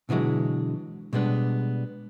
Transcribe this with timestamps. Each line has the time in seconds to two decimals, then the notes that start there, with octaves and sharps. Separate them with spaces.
0.09 B2 D3 E3 F#3 G#3
1.13 B2 G3 G#3 B3 D4